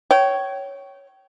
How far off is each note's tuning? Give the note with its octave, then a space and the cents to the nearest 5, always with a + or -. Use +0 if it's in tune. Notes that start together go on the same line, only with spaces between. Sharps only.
C#5 +0 G5 -30